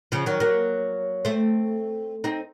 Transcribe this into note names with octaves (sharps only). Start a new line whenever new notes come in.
C#3 F3
D#3 F#3
F#3 A#3
A3 C4
C4 D#4